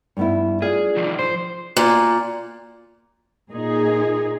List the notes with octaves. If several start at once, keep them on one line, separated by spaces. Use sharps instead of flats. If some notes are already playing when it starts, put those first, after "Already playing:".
G2 B3 E4
D4 F4 G#4 F5
C3 D#3 F3
F3 C5
A#2
A#2 D#4 G#4